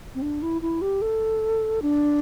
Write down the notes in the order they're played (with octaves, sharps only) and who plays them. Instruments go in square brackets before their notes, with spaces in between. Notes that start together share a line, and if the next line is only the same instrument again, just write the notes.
[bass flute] C4
D4
E4
E4
G4
A4
D4